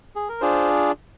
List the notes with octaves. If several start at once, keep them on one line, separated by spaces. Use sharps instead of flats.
G#4
A#4
D4 F4 G#4 C5